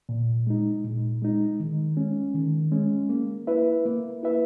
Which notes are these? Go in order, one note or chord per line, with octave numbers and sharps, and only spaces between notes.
A#2
G#3 D#4
A#2
G#3 D#4
D#3
G#3 C#4
D#3
G#3 C#4
A#3
E4 B4 E5
A#3
E4 B4 E5